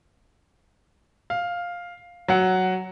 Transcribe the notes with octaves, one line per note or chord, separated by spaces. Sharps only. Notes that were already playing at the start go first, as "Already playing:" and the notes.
F5
F#3 F#5